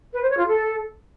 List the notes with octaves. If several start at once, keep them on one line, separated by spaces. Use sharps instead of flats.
B4
C5
C#5
F4
A4